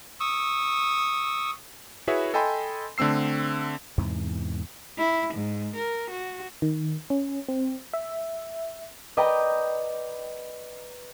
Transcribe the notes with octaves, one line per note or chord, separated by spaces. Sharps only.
C#6 D#6 E6
E4 F#4 G#4 B4 C#5 E5
A4 D#5 G5 G#5 B5 C6
D3 A3 C4 E6 C7
E2 G#2 C3 E3
E4
G#2
A#4
F#4
D#3
C#4
C4
E5
B4 D5 D#5 G5 A#5